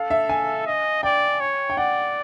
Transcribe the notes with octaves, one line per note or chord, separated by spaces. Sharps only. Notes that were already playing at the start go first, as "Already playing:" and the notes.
Already playing: A4 F5
E5
G#5
D#5
D5 G5
C#5
G5
D5 F#5